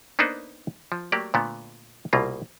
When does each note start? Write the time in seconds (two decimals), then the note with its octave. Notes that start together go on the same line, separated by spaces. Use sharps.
0.19 A#3 B3 D4 D#4 B4 C5
0.92 F3
1.12 F#3 A3 A#3 G4 D5
1.34 A#2 D3 A3 B3
2.13 C2 B2 A#3 F4